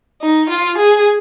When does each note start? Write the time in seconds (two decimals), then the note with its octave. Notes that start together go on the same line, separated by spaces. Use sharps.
0.22 D#4
0.49 F4
0.78 G#4